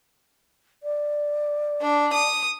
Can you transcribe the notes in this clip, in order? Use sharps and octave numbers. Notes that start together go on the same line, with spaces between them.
D5
D4
D#6